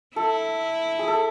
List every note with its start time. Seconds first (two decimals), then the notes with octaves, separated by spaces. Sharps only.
0.16 E4 A4
0.99 G#4
1.08 A4